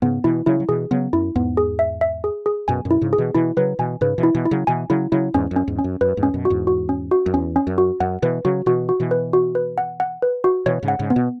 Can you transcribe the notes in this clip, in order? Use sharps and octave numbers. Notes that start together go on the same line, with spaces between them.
G#2 C#3 B3
B2 E3 E4
C#3 F#3 E4
F#3
B2 E3 G#4
C#3 F#3 B3
F#2 E4
E2 G#2 B3
G#4
E5
E5
G#4
G#4
F#2 B2 G#5
F#2 B2
E4
G#2 C#3
G#4
B2 E3
B2 E3 E4
C#3 F#3 B4
B2 E3 G#5
G#2 C#3 B4
B2 E3
E4
B2 E3
E4
C#3 F#3
B2 E3 G#5
C#3 F#3 E4
C#3 F#3 E4
E2 G#2 C#4
F#2
C#4
E2 G#2
C#4
F#2
F#2 B4
E2 G#2
C#4
F#2 B2
F#4
E2 G#2
F#4
C#4
F#4
F#2
E2 C#4
C#4
F#2
F#4
F#2 F#5
B2 E3 B4
C#3 F#3 F#4
B2 E3 F#4
F#4
B2 E3
B4
F#4
B4
F#5
F#5
B4
F#4
B2 E3 C#5
G#2 C#3
F#5
G#2 C#3
B3
B2